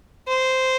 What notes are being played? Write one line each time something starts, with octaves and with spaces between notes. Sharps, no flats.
C5